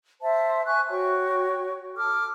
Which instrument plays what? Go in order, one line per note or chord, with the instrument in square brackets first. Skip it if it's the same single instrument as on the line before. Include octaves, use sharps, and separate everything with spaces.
[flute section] C5 E5 A5
G#5 C#6 F#6
F#4 C#5 G5 C#6
A4 D6 F6